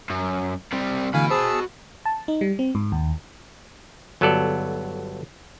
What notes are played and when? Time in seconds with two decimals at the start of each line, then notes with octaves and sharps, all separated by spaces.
0.10 F#2
0.73 C3 G3
1.14 D3 E3 A3 F#4 F5 G#5 B5
1.30 G#4 C5 A5 E6
2.05 A5
2.28 D#4
2.41 G3
2.59 C4
2.75 G#2
2.92 D#2
4.21 G1 F#3 B3 A4 D5